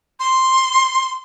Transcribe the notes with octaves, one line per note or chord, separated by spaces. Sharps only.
C6